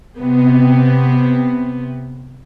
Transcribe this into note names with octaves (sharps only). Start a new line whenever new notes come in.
C3 B3